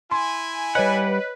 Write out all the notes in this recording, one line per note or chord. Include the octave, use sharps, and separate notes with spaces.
E4 G#5 C6
G3 B4 C#5 D#5 F#5